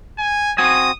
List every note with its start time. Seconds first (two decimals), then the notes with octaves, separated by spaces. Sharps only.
0.18 G#5
0.58 C4 F#4 G#5 D#6